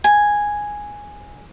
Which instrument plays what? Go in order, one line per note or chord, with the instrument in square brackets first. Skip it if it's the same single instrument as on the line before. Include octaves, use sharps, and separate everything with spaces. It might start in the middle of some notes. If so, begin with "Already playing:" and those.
[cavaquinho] G#5